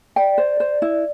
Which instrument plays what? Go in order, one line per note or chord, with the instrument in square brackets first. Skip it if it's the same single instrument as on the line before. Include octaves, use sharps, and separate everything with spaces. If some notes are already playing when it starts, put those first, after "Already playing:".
[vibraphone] D5 [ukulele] G5
[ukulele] C5
C5
E4